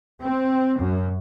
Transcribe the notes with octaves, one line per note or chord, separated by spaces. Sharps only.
C4
F#2